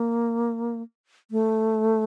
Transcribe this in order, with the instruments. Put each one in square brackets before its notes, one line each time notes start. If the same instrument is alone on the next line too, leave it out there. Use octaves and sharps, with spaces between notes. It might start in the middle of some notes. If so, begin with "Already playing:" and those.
Already playing: [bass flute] A#3
A3